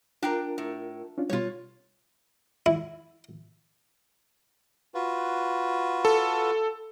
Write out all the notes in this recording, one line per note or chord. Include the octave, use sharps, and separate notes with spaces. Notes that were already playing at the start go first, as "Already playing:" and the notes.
D4 F4 A#4 G5 A#5
A2
C#4 D4 F4
B2 G3 F4 C#5
E4
F4 F#4 B4
A4